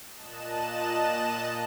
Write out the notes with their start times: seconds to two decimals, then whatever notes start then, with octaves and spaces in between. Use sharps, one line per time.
0.15 A#2 D#5 A5 F#6 E7